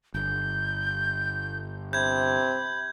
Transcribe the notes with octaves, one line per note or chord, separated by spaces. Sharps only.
G1 G6
C3 B5 G6 G#6